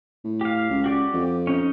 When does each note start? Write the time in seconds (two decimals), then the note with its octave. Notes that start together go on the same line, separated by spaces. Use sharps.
0.24 A2
0.41 G4 F5
0.70 C#2
0.84 F#4 G4 D5
1.13 F2
1.47 C#4 D#4